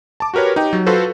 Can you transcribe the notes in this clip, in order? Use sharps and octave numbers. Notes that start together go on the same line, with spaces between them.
A5 D6
F#4 G4 A#4 B4 C#5
D#4 G4 G5
F#3
F4 F#4 A4 B4 C5